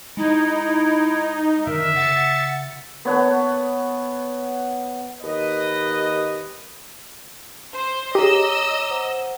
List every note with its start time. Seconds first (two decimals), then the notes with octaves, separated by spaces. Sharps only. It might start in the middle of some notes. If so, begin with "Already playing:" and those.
0.17 G#3 D#4 E4
1.66 F#2 D3 D#3 A#4 E5
1.95 C#3 F#5 A6 C#7
3.05 B3 C#5 F#5 A5
5.23 D#2 B4 D#5
7.74 C5
8.15 G4 G#4 C#5 D#5 A#5 D6 E6
8.90 C5 F#5